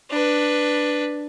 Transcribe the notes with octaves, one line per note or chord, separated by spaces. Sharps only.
D4 B4